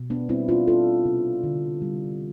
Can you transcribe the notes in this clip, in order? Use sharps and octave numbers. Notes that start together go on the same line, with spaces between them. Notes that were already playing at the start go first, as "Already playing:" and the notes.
Already playing: B2
B3 D4
G3 C4 E4
D4 F4
G3 F4 A4
C3
D3
G3